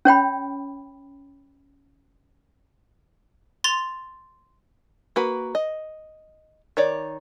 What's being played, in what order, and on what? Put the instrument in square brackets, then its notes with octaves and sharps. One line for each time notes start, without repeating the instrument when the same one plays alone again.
[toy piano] C#4 C#5 G5 B5
[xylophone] C6 A6 F7
[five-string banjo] A#3 F#4 B4
D#5
D#3 C#5 D5